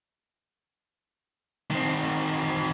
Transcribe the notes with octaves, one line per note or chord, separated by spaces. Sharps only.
D#3 C4